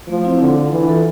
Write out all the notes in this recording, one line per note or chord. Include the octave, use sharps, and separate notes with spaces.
F3 A3
C4 E4
D3 D4
F4 A4
E3 D4
F4 A4